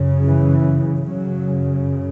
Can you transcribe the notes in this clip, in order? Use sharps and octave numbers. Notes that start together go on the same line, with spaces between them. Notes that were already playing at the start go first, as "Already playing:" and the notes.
Already playing: F#2 C#3
E3
F#2 C#3 F#3